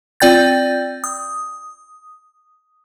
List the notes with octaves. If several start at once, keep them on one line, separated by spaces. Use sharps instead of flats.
C4 F4 D5 G5 G6 A6
D#6